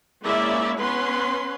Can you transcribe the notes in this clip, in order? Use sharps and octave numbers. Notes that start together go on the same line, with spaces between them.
G#3 A#3 C#4 E4 D5 E5
B3 C#4 B4 C6